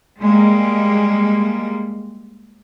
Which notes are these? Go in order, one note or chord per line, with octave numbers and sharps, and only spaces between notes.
G3 G#3 A#3